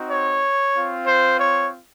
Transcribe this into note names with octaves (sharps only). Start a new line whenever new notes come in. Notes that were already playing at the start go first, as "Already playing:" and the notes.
Already playing: C4 D#4 F#4
C#5
C4 F4
C5
C#5